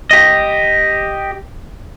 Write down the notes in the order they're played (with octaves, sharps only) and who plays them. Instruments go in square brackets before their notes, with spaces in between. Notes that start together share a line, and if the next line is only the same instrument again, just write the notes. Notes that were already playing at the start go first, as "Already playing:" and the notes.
[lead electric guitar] G4 D#5